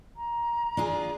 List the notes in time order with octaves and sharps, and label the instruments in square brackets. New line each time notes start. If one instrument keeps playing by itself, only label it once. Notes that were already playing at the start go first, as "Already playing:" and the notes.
[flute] A#5
[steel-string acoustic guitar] D4 F4 G#4